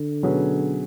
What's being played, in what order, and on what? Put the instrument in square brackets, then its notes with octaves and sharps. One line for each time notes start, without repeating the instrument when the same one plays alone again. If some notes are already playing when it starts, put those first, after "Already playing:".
Already playing: [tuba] D3
[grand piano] B2 F#3 C#4 G#4 B4